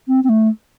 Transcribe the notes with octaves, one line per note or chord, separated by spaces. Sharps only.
C4
C4
A3